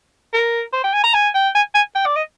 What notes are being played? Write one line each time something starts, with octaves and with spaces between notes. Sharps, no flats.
A#4
C5
G5
G#5
A#5
G#5
G5
G#5
G#5
G5
D5
D#5